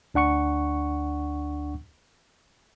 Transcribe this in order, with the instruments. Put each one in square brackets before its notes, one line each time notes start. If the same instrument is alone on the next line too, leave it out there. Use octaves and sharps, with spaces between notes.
[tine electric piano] D2 D4 F#5 C#6 C#7